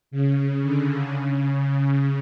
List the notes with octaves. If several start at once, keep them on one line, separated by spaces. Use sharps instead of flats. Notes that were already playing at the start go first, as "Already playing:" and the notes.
C#3
D3
C#3
C#3